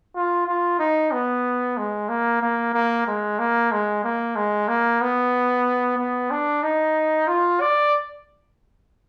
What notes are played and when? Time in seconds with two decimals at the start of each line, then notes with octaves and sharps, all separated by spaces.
0.15 F4
0.47 F4
0.79 D#4
1.12 B3
1.77 G#3
2.09 A#3
2.42 A#3
2.74 A#3
3.07 G#3
3.39 A#3
3.71 G#3
4.04 A#3
4.36 G#3
4.68 A#3
5.01 B3
5.98 B3
6.31 D4
6.63 D#4
7.27 F4
7.61 D5